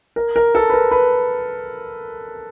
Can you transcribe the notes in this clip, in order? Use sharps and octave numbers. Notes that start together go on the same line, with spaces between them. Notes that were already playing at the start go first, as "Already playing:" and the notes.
A#4
A#4
A4
B4
A#4
B4